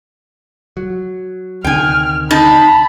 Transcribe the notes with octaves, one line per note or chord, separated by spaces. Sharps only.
F#3
D2 C3 D#3 G5 G#5 F6
D#4 A5 B5